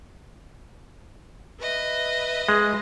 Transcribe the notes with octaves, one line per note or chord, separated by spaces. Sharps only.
B4 D#5 E5
G#3